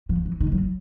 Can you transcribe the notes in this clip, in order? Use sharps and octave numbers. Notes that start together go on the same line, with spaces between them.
F3
E3
D#3
F#3